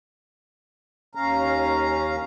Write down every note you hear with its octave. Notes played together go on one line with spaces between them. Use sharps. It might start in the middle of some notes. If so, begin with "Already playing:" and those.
D#2 C#4 F5 A#5